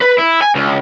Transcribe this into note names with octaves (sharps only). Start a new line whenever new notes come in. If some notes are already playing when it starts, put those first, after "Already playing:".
B4
E4
G#5
C#2